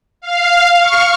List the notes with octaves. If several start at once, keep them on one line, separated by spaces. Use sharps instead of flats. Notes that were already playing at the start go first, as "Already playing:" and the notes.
F5
C#6 F6